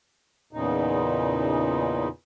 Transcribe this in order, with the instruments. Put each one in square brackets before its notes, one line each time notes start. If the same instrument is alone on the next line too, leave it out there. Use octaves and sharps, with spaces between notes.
[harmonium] E2 A#2 C#3 D#4